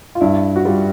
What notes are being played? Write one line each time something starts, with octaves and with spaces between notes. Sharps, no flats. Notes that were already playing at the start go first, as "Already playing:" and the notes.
F4
G2 E4
F#4
G3 F4